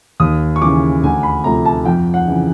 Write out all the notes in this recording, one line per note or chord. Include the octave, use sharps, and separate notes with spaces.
D#2 D#6
C#6
C#3 E3 D6
D2 G#5
B5
C3 F3 A3 A#5
A5
F2 G5
F#5
C#3 E3